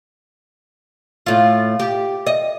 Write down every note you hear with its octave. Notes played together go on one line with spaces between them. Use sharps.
A2 F4
G4
D#5